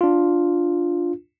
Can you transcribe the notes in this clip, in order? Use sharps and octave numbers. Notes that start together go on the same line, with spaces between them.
D4 F4